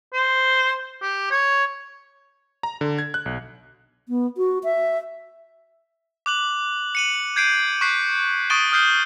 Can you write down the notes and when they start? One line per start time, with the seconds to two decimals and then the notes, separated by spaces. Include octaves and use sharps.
0.13 C5
1.02 G4
1.31 C#5
2.63 A#5
2.81 D3
2.98 G#6
3.14 F#6
3.26 B1
4.09 B3
4.37 F#4
4.64 E5
6.26 D6 F#6 F#7
6.95 C#7 D#7 F#7
7.36 G6 G#6 C7 D7 D#7
7.81 C#6 F#6 B6 C7
8.50 C#6 D#6 A6 D7 D#7 G7
8.72 D#6 F6 G6 C7 G7